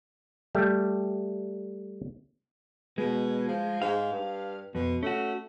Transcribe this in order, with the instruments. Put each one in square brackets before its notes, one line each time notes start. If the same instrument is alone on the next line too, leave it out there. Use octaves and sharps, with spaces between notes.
[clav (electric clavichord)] G3 A3 G4
[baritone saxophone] B2 [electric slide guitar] G#3
[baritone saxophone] F3
[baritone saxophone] G#2 [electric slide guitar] F5
[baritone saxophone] G2
[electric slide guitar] F2 [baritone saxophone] B2
[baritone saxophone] A3 [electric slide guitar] C#4 F#4